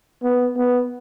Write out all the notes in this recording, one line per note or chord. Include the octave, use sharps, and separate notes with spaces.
B3
B3